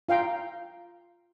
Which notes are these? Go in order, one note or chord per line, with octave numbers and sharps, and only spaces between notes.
F4 F5 G5 A#5